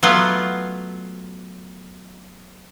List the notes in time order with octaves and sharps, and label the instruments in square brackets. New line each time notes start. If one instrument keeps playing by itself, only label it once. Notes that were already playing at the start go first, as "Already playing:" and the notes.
[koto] F#3 A3 B3 F4